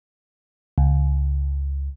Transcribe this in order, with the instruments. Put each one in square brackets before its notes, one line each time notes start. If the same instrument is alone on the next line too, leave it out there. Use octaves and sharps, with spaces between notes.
[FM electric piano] C#2